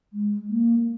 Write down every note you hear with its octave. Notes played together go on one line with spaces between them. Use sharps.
G#3
A#3